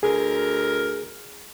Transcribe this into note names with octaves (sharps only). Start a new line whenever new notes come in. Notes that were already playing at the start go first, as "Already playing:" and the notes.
D2 G#4 A#4